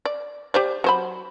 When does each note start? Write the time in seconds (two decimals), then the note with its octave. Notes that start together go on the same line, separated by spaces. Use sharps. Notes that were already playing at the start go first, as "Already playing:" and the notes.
0.05 D5
0.54 G4 C5 D5
0.84 F#3 C5 B5